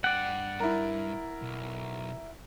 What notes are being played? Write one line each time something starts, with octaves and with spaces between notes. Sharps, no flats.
G2 D5 F#5 G5
G2 E4 A#4
B1